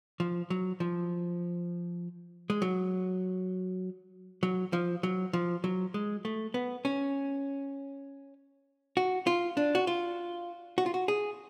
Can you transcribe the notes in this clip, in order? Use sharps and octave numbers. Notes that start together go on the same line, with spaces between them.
F3
F#3
F3
G#3
F#3
F#3
F3
F#3
F3
F#3
G#3
A3
B3
C#4
F#4
F4
D4
F#4
F4
F#4
F4
F#4
G#4